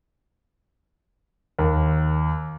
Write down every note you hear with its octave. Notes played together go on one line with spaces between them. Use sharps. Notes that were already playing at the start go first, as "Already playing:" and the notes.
D#2